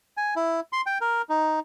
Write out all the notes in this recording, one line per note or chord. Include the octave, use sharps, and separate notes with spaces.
G#5
E4
C6
G5
A#4
D#4